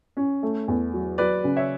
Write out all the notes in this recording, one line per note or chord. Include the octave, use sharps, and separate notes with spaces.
C#4
A3
E2
F#3
F#3 B4 D5
C#3
C#5 E5